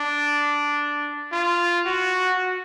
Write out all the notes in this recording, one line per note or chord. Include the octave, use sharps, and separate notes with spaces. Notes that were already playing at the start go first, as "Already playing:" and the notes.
Already playing: D4
F4
F#4